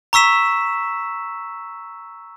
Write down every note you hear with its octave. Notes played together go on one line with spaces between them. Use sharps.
A#5 C#6 E6 B6 E7